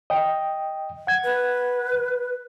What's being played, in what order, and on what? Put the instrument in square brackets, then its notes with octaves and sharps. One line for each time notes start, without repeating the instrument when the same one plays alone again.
[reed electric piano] D#5 G5
F#5 G#6
[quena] B4